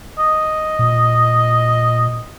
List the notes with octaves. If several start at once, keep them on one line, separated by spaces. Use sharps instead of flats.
D#5
A#2